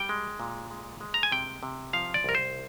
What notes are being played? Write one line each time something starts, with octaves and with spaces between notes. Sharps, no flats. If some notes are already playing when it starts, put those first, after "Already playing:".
Already playing: G3 G5
G#3
A#2
G#3
G#3
A#5
G#5
C3 G5
C3
F3 F5
D5
C2 A#4
C5